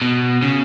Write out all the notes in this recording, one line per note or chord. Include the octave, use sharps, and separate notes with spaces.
B2
C#3